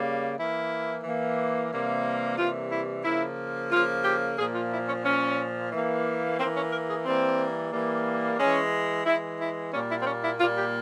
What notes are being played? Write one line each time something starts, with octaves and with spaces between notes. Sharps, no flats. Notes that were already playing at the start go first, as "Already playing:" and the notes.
Already playing: C#3 G3 A#3
E3 A#3 E4
E3 A#3
C3 E3 G3 A#3
C3 E3 G3 A#3 F4
E4
C#3 F3 A#3 E4
C#3 F3 A#3 F4
G4
A#2 F3 A#3 G#4
F4
E4
C#4
A#2 F3 A#3 C#4
E3 A#3
E3 A#3 C4
C#4
A#4
G#4
E3 G3 A#3 C4
E3 G3 A#3
E3 G#3 C#4
E3 G#3 E4
E4
A#2 G3 A#3 C#4
E4
C4
C#4
E4
A#2 G3 A#3 F4
G4